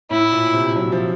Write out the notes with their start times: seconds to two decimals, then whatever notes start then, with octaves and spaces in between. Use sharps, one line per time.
0.10 A2 E4
0.32 A#2
0.54 C3
0.76 F#3
0.92 F3